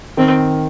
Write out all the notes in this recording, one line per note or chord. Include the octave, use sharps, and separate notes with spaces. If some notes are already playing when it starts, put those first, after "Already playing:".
D#3 C4